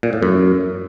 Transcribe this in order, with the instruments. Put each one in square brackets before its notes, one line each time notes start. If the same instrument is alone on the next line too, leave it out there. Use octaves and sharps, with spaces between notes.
[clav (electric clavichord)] A#2
A2
F#2